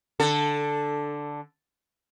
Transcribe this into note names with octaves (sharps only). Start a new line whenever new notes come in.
D3 A4